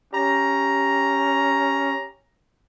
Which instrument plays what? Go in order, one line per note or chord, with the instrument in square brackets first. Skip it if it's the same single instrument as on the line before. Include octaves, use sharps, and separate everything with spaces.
[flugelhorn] C#4 [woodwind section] G4 A#5